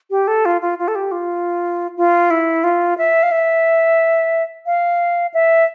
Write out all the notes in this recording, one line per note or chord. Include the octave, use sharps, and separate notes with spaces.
G4
A4
F4
F4
F4
A4
G4
F4
F4
E4
F4
E5
F5
E5
F5
E5